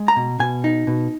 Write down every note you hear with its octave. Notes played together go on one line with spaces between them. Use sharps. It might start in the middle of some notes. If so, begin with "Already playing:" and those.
Already playing: G#3
A#5
B2
B2 G#5
D#4
B2